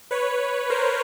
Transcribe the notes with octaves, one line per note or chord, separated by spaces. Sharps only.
B4 C#5
A#4 C5